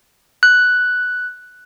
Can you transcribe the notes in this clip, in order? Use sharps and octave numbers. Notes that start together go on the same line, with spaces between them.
F#6